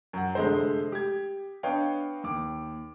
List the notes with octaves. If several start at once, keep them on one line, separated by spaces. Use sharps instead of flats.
F#2 F#5
F1 D3 G#3 A3 C5
G4 G#6
B3 D4 C#5 D#5 F5 G5
D#2 D6